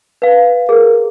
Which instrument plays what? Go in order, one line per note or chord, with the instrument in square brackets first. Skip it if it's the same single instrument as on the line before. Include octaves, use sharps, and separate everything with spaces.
[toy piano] B4 F5
[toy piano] G#4 [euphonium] A#4